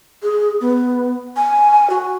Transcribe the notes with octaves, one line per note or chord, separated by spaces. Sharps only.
G#4
B3
G#5
F#4